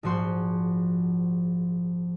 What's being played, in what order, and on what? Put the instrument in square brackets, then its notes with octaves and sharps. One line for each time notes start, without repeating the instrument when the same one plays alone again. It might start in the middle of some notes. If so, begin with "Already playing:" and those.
[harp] A#1 G#2 F3 F#4 C6 G6